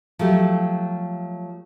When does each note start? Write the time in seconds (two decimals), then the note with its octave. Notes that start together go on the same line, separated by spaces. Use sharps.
0.19 F3 F#3 A3 G4